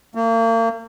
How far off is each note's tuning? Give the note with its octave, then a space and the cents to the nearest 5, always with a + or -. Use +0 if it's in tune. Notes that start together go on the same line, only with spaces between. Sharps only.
A#3 -40